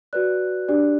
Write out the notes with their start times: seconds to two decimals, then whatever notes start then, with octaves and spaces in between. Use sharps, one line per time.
0.13 F#4 B4 D5 F#6
0.68 D4 G4 D5